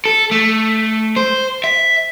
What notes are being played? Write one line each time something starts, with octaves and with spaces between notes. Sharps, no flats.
A4
A3
C5
E5